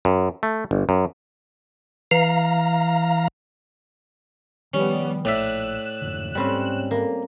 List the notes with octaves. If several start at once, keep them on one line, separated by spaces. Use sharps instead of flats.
F#2
A3
G1
F#2
E3 F5 A#5
D#3 F3 G3 B3 C#4
A#1 A2 D5 E5 F#6 E7
F2 G#2 D3
G#2 G3 C4 C#4
A#3